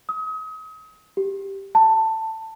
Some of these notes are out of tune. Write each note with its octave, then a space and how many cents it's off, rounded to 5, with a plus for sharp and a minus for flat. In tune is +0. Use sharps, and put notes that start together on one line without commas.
D#6 +35
G4 +0
A5 +15